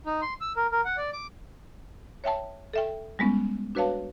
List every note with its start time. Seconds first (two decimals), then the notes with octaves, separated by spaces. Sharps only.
0.06 D#4
0.22 C6
0.41 E6
0.57 A#4
0.72 A#4
0.85 F#5
0.97 D5
1.13 D6
2.24 C#5 E5 G5 A5
2.73 A4 E5 G5
3.19 G3 G#3 B3 C#4
3.75 D4 F#4 B4 C#5 F5 A5